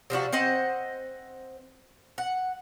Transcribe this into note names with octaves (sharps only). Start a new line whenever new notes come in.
C3 F3 D4 F#4
C4 C5 D#5 F#5
F#5